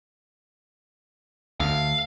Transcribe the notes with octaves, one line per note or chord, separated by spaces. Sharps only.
D2 F5